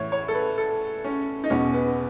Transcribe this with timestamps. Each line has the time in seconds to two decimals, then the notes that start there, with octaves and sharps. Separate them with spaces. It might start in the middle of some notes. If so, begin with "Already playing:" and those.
Already playing: A2 E3 C#5
0.12 C#5
0.28 A4
0.34 B4
0.58 A4
1.04 C#4
1.44 D#4
1.50 E2 B2 C#4
1.73 B3